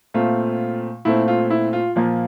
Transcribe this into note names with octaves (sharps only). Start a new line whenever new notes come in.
A#2 A3 C4 F4
A#2 A3 C4 E4
F4
E4
F4
A#2 F3 A#3